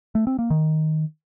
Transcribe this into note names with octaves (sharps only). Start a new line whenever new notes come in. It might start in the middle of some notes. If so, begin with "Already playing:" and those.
A3
C4
A#3
D#3